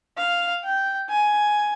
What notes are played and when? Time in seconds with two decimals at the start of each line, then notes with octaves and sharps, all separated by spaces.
0.17 F5
0.64 G5
1.10 G#5